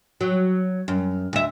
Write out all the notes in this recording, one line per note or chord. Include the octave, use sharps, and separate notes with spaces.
F#3
F#2
D2 E5